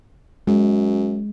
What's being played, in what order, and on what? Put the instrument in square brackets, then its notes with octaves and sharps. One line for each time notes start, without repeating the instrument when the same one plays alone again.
[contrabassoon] F#2 [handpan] G#3